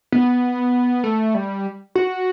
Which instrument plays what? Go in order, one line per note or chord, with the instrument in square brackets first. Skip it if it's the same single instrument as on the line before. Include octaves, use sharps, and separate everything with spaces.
[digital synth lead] B3
A3
G3
F#4